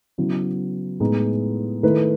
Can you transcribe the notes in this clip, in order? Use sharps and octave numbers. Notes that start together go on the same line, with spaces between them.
C#3 F#3 B3 E4
A2 G#3 B3 D#4
D#3 A3 E4 B4